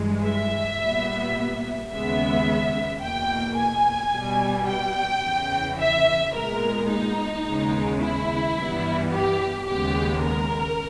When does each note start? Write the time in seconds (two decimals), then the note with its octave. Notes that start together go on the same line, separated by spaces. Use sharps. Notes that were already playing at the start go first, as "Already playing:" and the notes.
Already playing: G2 E3 G#3
0.25 E5
0.81 A#2 G3 B3
1.92 D#2 C#3 G#3 B3 E5
3.02 E2 B2 A#3 G5
3.57 G#5
4.13 B2 G3 B3
4.68 G5
5.24 E2 C#3 E3
5.80 E5
6.35 A#2 G#3 B3 A#4
6.91 D#4
7.46 D#2 C#3 G#3 B3
8.01 E4
8.57 G2 E3 G3 B3
9.13 G4
9.68 D#2 C#3 G#3 B3 G4
10.23 A#4